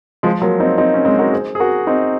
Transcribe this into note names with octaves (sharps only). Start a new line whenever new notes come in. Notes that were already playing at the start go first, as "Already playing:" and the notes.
F3 G#3
F#3 A#3
C4 D#4
C4 D#4
C#4
G#3 C4
F#4 A#4
G#4 C5
G#4
F#4 A#4
C4 D#4